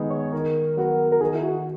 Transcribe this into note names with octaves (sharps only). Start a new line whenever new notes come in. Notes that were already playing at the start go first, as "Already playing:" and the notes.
Already playing: D#3 G#3 B3 D#4
C#5
D#3 A#4
F#3 B3 F#4
A#4
D#3 G#4
E4
F#4